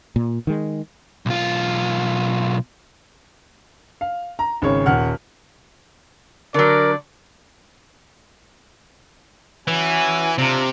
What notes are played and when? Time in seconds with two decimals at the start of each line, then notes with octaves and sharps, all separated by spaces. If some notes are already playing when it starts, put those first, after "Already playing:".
0.16 A#2
0.47 D#3 G#3
1.26 B1 F4
4.01 F5
4.39 A#5
4.62 G#1 C#3 C#5
4.86 D#1 C#5 F#5 F6
6.54 D3 F#3 A#4 D5
9.68 E3 C#4 F#4 G#5
10.38 C3 D4 F4 A#5